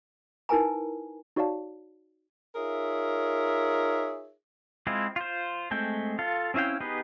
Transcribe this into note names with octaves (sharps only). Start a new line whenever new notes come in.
D#4 E4 A#4 B4 G#5 A#5
D#4 F#4 C#5 D5 F5 A5
D#4 F4 G#4 A#4 C#5 E5
G#3 C4 E4 F4
F4 C5
G#3 A3 C4 G5
F4 A4 F5
C4 C#4 E4 F5 G5
B3 D#4 G4 G#4 B4